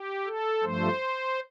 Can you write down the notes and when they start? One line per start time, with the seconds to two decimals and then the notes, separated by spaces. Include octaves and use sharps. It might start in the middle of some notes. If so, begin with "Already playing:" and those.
Already playing: G4
0.26 A4
0.63 G2 F3 A3 C5